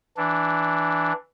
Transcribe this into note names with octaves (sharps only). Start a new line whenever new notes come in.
E3 D4